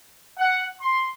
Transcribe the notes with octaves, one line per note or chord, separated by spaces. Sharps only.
F#5
C6